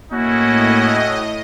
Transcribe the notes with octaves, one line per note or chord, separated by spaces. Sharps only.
A2 A#3 C#4 E4 F#4 D#5